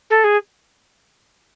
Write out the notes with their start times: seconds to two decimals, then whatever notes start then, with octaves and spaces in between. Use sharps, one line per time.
0.10 A4
0.24 G#4